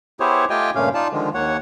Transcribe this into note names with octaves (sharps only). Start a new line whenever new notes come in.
B3 E4 G4 G#4 C5 C#5
A3 F4 G4 D#5 G5 G#5
G2 A#2 C#3 A3 C#4 F5
D#4 F4 D5 A5
D3 D#3 F3 G#3
D#2 A#3 C#5 F#5